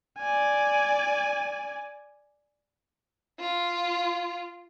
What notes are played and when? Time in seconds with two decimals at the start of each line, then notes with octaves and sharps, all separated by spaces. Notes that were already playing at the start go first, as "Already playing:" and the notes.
0.18 D5 G#5
3.40 F4